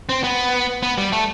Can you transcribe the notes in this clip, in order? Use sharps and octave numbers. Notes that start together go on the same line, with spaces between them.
C4
B3
B3
G3
A3